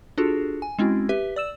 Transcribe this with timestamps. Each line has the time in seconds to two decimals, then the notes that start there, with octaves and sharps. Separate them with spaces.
0.18 D4 F4 F#4 G#4 A4
0.62 G#5
0.79 G#3 C4 C#4 E4 F#4
1.09 G4 B4 E5
1.36 D5 E6 E7